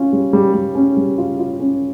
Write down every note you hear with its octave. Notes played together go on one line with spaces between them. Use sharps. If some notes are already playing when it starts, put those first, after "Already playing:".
Already playing: C#4 F4
G3
G3
G3
C#4
G3
F4
F4
C#4